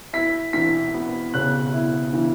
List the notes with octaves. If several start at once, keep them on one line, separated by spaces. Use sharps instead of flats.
E4 B6
E3 B6
B3
C#3 F#6
E4
E3